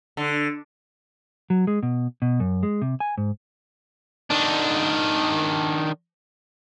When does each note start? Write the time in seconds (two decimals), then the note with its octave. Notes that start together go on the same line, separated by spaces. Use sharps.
0.17 D3
1.50 F#3
1.67 G#3
1.83 B2
2.22 B2
2.40 F#2
2.63 G#3
2.82 C3
3.00 G#5
3.18 G#2
4.30 D#3 D4